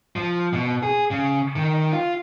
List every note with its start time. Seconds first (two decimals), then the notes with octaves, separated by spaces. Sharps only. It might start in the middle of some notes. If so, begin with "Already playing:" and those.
0.16 F3
0.53 B2
0.83 G#4
1.11 C#3
1.56 D#3
1.93 F4